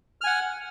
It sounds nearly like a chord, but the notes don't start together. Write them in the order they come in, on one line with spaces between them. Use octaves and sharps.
F6 G#5 F#5